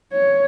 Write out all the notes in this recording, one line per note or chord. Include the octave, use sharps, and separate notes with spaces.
C#5